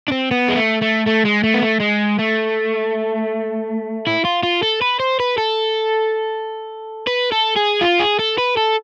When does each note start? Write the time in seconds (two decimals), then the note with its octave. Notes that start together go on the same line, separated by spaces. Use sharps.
0.08 D4
0.12 C4
0.31 B3
0.48 G#3
0.56 A3
0.81 A3
1.06 A3
1.25 G#3
1.44 A3
1.54 B3
1.63 A3
1.80 G#3
2.19 A3
4.07 E4
4.25 F4
4.43 F4
4.63 A4
4.81 B4
5.00 C5
5.20 B4
5.38 A4
7.07 B4
7.32 A4
7.57 G#4
7.82 F4
8.00 G#4
8.19 A4
8.38 B4
8.57 A4